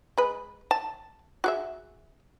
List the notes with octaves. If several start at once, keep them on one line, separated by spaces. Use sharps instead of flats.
G#3 B4
A5
F#4 G#4 E5